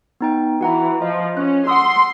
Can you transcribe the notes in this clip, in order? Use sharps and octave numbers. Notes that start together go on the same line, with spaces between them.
B3 D#4 G5
E3 F#4 F#5 A#5
F3 D#5
C#4 F#6
F#5 C6 D#6 E6